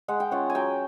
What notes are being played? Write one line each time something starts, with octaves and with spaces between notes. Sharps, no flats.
G#3 F#5
G5
C#4 F4 F#5
G#5
F#3 G5